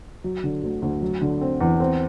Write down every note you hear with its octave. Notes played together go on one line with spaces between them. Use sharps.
F#3
D3
D2
D2
F#3
D3
C4
E2
C4